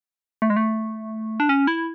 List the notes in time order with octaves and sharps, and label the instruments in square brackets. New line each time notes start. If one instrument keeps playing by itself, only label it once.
[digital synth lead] A3
G#3
A3
D4
C#4
E4